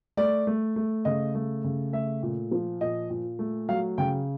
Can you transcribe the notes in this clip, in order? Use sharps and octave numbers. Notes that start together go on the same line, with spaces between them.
A3 D5
A3
A3
C#3 D#5
A3
C#3
A3 E5
A#2
F3
A#2 D#5
A#2
A3
F#3 F5
C#3 G5